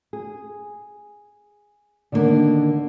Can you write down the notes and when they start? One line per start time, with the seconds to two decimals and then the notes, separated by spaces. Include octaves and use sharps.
0.13 G#4
2.12 D3 D#3 G3 A#3 B3 D4